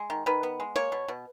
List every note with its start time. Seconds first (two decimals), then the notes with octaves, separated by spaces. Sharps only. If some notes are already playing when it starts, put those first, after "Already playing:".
Already playing: G#3
0.10 D#3
0.26 D#3 B4
0.43 B3
0.60 G#3
0.76 A#3 C#5
0.92 B2
1.08 B2